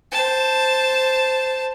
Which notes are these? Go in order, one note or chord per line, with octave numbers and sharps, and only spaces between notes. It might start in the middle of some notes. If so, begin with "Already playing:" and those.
C5 A5